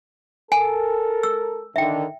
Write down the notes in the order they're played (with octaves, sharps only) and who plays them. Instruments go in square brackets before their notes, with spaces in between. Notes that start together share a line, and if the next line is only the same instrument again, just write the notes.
[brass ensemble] A4 A#4 [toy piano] G#5
[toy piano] E6
[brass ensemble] D3 D#3 [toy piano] E5 G5